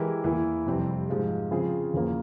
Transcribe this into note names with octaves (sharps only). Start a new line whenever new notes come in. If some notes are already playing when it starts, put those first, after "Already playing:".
Already playing: E3 G#3 E4 G4 A#4
E2 E3 A#3 E4
F2 C3 G3 C4
G#2 F3 G#3
C#3 F3 C4 F4 G#4
E2 C#3 F3 A#3 F4